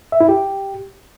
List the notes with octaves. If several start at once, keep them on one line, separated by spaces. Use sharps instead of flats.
E5
E4
G4